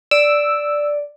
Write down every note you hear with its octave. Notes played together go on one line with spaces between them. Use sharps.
D5 E6